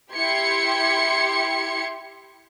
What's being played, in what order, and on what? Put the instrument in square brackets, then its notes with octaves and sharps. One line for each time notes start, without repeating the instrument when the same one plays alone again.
[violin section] E4 G4 C6 G#6 C#7